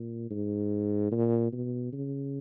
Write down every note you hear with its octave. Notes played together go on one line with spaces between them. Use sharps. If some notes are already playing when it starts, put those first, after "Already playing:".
Already playing: A#2
G#2
A#2
B2
C#3